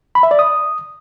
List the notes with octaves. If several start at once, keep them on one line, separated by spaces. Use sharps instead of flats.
B5
E5
D5
D#6